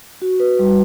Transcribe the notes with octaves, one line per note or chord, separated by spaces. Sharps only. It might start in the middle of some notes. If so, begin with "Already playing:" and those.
F#4
B4
G3